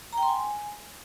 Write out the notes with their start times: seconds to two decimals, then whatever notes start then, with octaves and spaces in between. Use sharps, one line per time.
0.13 A#5
0.18 G5
0.23 C6
0.28 G#5